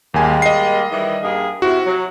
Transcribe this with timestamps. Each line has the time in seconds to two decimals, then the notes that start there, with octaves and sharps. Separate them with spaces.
0.14 D#2 G3 G#3 A#3 G#5
0.42 D#5 C7
0.90 D#3 E3 G3
1.22 G2 A#3 G#4
1.62 C3 E4 F#4
1.86 F#3